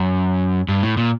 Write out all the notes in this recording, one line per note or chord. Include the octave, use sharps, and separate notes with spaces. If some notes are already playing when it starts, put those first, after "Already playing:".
Already playing: F#2
G2
A2
A#2